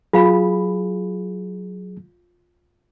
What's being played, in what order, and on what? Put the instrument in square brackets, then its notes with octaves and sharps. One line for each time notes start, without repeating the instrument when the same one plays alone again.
[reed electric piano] F#3 G#4 [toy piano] F4 F5 B5